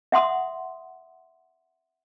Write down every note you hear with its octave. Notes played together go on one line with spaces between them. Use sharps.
E5 F#5 C6 D#6